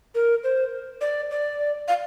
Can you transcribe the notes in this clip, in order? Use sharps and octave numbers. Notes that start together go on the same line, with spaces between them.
A#4
C5
D5
D5
F5